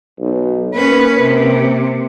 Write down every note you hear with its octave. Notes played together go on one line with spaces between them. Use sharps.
B1
A#3 C#4 B4
C3